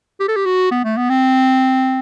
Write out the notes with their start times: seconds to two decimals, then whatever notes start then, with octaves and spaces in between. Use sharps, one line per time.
0.20 G4
0.28 A4
0.36 G4
0.46 F#4
0.71 B3
0.84 A3
0.97 B3
1.10 C4